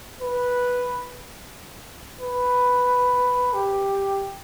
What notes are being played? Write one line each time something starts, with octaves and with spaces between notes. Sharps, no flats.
B4
B4
G4